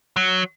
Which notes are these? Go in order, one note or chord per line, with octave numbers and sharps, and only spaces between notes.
F#3